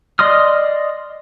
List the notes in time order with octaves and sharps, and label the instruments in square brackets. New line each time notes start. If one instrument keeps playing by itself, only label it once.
[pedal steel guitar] D5 D#5 C6 D#6 F6